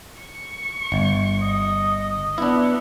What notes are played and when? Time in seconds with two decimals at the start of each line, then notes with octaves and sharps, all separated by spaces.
0.19 C#6
0.92 G1
1.42 D#5
2.38 B3 D4 E4